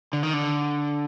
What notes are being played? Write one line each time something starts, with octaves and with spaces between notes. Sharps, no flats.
D3
D#3
D3